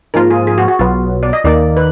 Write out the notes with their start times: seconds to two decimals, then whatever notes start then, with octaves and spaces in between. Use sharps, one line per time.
0.14 G#2 F3 A#3 F4 A#4
0.31 G#4
0.47 G#4
0.58 F#4
0.68 F#4
0.79 B1 B2 F#3 B3 F4
1.23 D5
1.33 D#5
1.44 D#2 D#3 A#3 D#4 A#4 D5
1.77 B4